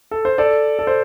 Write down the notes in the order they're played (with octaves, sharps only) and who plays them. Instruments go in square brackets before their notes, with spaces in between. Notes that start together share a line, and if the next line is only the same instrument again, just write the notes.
[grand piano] A4
C5
A4 D5
A4
C5